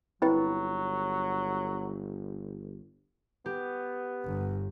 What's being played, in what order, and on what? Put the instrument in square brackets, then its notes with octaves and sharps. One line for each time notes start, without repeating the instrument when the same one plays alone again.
[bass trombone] G1 [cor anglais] F#3 [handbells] C4 E4 B4
[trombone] B3 [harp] G4
[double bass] G1